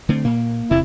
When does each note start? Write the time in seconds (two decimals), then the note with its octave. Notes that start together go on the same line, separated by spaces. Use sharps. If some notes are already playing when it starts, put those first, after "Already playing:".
0.09 D3 A3 C4
0.25 A#2 A#3
0.71 E1 C3 E4